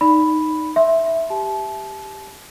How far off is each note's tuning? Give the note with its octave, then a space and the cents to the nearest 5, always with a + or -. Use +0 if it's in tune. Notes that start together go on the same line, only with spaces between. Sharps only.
D#4 +0 D5 +0 B5 +0
E5 +0 C6 +10
G4 +0 A5 -30